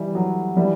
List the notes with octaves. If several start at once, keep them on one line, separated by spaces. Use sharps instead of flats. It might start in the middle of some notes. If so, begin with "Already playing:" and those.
Already playing: E3 G3
F#3
E3 G3